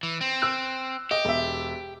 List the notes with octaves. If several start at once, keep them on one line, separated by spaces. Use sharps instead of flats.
E3
C4
E6 F#6
G4 D#5
E1 E5